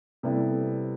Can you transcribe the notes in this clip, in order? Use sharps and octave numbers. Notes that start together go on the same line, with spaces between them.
C3 G3 B3 E4 A4